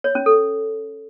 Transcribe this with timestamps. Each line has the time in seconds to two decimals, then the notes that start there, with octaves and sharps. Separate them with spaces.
0.04 C#5
0.15 C#4
0.26 A4